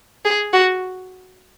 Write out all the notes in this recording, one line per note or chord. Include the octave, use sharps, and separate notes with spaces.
G#4
F#4